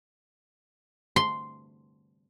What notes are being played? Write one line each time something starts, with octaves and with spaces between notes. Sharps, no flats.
C6